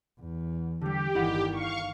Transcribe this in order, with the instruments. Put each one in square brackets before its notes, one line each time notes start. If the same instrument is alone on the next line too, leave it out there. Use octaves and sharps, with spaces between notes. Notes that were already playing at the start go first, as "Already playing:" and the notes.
[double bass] E2
[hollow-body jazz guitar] D3 G3 [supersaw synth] G4
[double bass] G1 D#3 [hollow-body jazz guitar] E4 D#5 F#5
[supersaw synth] F5 C#6